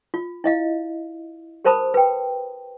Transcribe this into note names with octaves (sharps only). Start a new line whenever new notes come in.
F4
E4 D#5 F5
G4 A#4 C5 A5 B5 D#6
B4 G5